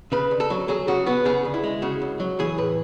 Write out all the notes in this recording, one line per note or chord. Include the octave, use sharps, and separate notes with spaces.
C#3 B4
D2
A4
F#3
F#3 G#4
C#3 F#4
B3 F#4
C#3 G#4
D2
E4
G#3
C#3 F#4
C#2
F#3
E3 G#4
A2 B4